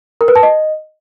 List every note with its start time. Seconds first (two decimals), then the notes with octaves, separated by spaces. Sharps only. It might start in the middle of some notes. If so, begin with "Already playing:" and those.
0.21 A#4
0.28 B4
0.36 A5
0.43 D#5